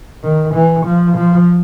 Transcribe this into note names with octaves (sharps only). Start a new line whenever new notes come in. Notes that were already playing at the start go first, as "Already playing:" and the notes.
D#3
E3
F3
F3